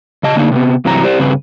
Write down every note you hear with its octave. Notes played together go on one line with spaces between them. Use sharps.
C#3 D#5 A5
D3 A#3 D4 D#4
C3 A3 B3
G2 C3 E3 F#3 A#5
G4 C5 D5
G2 C#3 C4 B4